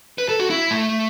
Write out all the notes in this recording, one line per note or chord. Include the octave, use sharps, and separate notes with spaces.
B4
A4
F#4
E4
A3